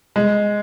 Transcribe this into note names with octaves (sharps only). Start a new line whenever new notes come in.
G#3